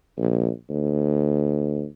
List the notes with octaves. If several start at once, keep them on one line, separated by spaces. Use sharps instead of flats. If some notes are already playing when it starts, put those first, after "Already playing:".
A#1
D2